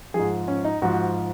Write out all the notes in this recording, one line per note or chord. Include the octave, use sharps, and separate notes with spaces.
G#2 F3 G#4
C#4
D#4
G#2 F3 F#4